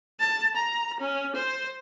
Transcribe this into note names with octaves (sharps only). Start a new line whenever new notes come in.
A5
A#5
C#4
C5